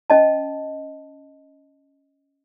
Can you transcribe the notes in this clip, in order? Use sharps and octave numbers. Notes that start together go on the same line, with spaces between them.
C#4 D#5 A5